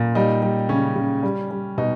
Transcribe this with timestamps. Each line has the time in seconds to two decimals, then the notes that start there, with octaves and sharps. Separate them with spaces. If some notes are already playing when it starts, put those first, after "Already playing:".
Already playing: A#2
0.15 G3 D#4
0.42 G3
0.69 C#3 C#4
0.96 C#3
1.23 G3
1.51 G3
1.78 B2 D#4